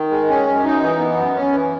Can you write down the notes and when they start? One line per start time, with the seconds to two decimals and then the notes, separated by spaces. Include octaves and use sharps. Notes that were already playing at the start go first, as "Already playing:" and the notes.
Already playing: D#3
0.11 G#3
0.29 C#4
0.47 F#2
0.64 D#4
0.81 E3
0.99 B3
1.17 F#2
1.35 C#4
1.52 E3